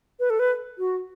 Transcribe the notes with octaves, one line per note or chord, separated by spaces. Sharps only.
B4
A4
B4
F#4